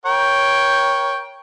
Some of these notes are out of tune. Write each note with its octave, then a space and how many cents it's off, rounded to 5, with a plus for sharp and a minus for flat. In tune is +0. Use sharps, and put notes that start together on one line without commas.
A#4 +30 C#5 +0 G5 +0